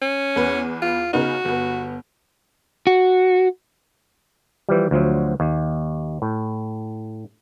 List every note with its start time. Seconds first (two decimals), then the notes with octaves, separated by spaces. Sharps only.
0.02 C#4
0.36 E2 B4
0.82 F4
1.13 C#3 B3 D#4 F#4
1.45 G1 B3
2.87 F#4
4.69 E3 F3 G3
4.91 D2 F3 F#3
5.40 D#2
6.22 A2